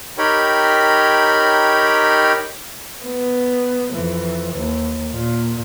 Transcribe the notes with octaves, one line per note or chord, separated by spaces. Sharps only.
D#4 G4 A#4 C#5 G5 B5
B3
F2 E3
D#2
A#2